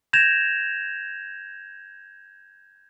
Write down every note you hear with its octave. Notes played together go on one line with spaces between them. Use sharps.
G6 G#6 A#6 E7 F7